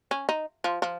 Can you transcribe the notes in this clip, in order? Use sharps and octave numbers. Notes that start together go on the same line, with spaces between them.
C#4
D#4
F3
F3